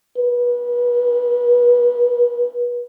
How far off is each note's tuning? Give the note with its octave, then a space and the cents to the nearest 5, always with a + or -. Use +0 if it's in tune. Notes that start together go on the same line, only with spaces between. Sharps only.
B4 -30